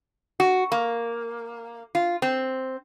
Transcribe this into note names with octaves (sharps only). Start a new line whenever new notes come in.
F#4
A#3
F4
C4